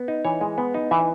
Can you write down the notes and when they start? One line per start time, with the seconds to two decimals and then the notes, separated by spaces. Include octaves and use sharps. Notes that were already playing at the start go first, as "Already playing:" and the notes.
Already playing: B3
0.08 D#4
0.25 E3 C#5
0.41 G#3
0.58 B3
0.74 D#4
0.91 E3 E5